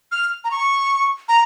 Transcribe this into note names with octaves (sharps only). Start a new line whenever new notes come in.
F6
A#5
C#6
A#5